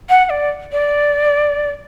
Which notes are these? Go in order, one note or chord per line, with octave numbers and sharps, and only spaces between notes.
F#5
F#5
D5
D5